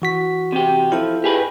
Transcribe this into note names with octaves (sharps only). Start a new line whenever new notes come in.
E3 F#4 B6
C3 G4
F3 E4 F4 A4
G4 G#4 B4